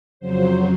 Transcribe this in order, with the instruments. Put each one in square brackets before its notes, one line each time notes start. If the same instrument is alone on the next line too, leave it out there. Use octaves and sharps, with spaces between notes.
[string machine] F2 C#3 F#3 C5